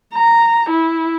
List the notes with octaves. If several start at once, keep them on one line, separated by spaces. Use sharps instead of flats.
A#5
E4